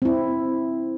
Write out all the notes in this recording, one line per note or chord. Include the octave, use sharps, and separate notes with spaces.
C4 E4